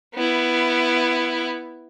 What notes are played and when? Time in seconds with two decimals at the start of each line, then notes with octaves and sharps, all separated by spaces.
0.14 B3 E4